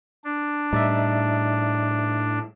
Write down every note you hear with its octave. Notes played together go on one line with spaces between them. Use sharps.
D4
A2 G3 D#4 D5 E5